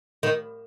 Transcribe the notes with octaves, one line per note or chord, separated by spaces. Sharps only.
D#3